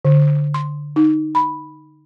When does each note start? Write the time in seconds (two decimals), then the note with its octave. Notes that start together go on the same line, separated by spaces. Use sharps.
0.05 D3
0.54 C6
0.96 D#4
1.35 B5